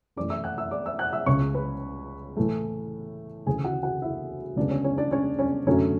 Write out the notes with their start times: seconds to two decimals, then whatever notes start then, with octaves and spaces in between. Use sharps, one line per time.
0.16 F#2 E3 A3 D5 D6
0.30 E5 E6
0.44 F#5 F#6
0.58 E5 E6
0.71 D5 D6
0.86 E5 E6
0.99 F#5 F#6
1.12 E5 E6
1.26 C#2 C#3 G#3 C#5 C#6
1.54 B4 B5
2.37 A2 E3 A3
3.46 D2 C#3 E3 G#4 G#5
3.64 F#4 F#5
3.83 F#4 F#5
4.02 E4 E5
4.56 D2 C#3 G#3 B3 D4 D5
4.70 C#4 C#5
4.84 C#4 C#5
4.97 D4 D5
5.11 C#4 C#5
5.39 C#4 C#5
5.67 F#2 D3 F#3 A3 C#4 C#5